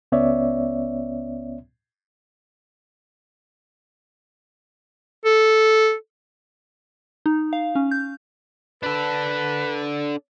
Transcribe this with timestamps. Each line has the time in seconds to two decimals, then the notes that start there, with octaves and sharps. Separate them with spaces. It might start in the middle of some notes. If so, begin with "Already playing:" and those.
0.12 C#2 B3 C#4 C#5 D5 E5
5.25 A4
7.26 D#4
7.53 F5
7.75 C#4
7.91 G6
8.83 D4 A4 B4